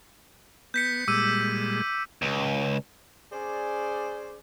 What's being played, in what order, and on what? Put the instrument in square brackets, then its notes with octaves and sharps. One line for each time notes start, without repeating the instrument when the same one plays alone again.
[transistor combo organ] B3 [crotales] G6 B6 C#7
[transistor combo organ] A#2 G3 G#3 [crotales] D6 E6 D#7
[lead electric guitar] C#2
[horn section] C#4 G#4 C5 D5